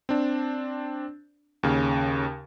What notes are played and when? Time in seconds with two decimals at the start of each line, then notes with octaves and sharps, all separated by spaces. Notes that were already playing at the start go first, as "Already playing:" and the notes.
0.09 C4 D4
1.63 D#2 C#3